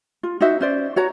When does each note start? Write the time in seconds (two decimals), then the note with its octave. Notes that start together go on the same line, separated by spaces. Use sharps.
0.23 F4
0.41 D#4 F#4 C5 E5
0.61 C#4 C5 D5
0.96 F#4 C#5 A#5